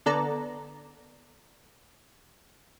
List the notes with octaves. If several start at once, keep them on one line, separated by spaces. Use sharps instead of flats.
D3 B3 A4 D5 A#5